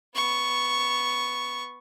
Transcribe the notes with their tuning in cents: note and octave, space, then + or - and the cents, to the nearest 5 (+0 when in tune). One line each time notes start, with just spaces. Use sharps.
B3 +0 C#6 +0